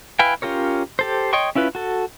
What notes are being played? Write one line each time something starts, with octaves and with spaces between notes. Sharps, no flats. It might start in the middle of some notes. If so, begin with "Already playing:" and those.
E4 B4 F5 G5 G#5
C#4 F4 G4 A#4 C#5
G4 A4 C5
C#5 D#5 G5 C6 C#6
C#4 E4 F4 B4
F#4 A4